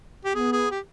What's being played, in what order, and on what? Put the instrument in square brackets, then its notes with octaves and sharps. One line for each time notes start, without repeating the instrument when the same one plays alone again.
[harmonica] G4
[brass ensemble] B3 [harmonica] G#4
[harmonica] G#4
G4